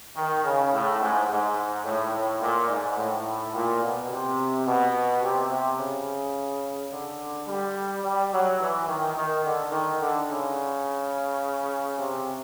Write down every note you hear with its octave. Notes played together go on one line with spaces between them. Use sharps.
D#3
C#3
A2
G#2
G#2
A2
A2
A#2
G#2
A2
A#2
B2
C3
B2
C3
C3
C#3
D3
G3
G3
F#3
E3
D#3
D#3
D3
D#3
D3
C#3
C3